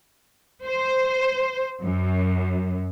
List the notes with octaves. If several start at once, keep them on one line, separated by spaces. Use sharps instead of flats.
C5
F#2